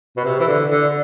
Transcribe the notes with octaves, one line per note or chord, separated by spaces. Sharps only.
B2
C3
E3
D3
D3